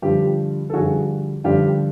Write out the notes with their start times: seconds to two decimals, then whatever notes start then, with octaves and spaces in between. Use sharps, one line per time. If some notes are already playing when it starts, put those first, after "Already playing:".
0.02 G2 D3 F3 F4 G4
0.70 A4
0.73 G2 D3 F3 F#4 G#4
1.44 G2 D3 F3 F4 G4